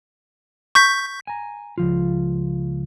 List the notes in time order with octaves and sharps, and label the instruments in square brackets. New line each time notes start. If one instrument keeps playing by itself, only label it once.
[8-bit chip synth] C#6 G6 B6
[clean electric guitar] G#5 A#5
C#2 F3 F4